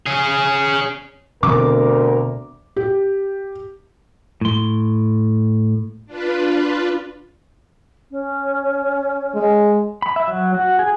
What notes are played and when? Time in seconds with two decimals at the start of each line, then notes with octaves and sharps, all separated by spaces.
0.06 C#4 G#4
1.43 D2 B2 D3 C4 A#4 D6
2.76 G4
4.41 A2 C6
6.06 D4 F4 B4
8.11 C#4
9.35 G#3
10.02 B5
10.16 E5
10.28 F#3
10.54 F#4
10.79 G#4